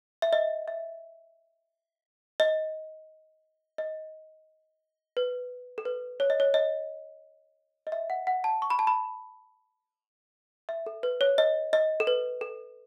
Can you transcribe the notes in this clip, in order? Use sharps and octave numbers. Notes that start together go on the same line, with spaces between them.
E5
D#5
E5
D#5
D#5
B4
A4
B4
C#5
D#5
C#5
D#5
D#5
E5
F#5
F#5
A5
C#6
B5
A5
B5
E5
A4
B4
C#5
D#5
D#5
A4
B4
A4